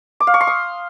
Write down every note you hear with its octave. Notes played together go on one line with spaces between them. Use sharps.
D6
F5
C#6
C6
D#6